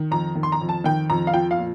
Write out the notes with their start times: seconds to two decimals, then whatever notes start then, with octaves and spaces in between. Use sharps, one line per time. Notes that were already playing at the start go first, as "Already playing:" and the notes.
Already playing: D#3
0.11 F2 A#5
0.35 D#3
0.43 C6
0.52 A#5
0.61 F2
0.69 A5
0.84 D#3 G5
1.10 F2 A#5
1.27 F5
1.34 F3 G5
1.51 F5
1.58 A#2